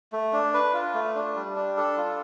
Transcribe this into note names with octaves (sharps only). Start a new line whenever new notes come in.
A3
D4
B4
F4
A3
D4
G3
D4
A4
F4